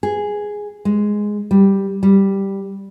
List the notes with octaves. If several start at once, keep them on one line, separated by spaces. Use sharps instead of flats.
G#4
G#3
G3
G3